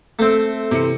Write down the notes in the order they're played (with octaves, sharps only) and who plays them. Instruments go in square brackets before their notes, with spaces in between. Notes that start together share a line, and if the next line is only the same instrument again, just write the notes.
[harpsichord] A3 C4
[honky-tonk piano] C3 E3 C#7